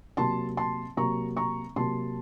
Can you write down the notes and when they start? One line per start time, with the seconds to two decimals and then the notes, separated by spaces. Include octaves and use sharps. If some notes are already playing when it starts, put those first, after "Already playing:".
0.17 C3 F#3 A#3 A5 C6
0.57 A5 C6
0.97 C3 F#3 A#3 A#5 C#6
1.37 A#5 C#6
1.76 C3 F#3 A#3 A5 C6